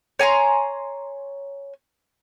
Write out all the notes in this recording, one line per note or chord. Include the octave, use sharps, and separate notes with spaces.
C#5 G#5 A#5 C6